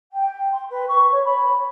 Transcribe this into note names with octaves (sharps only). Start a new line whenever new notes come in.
G5
C6
B4
C#6
C#5
B5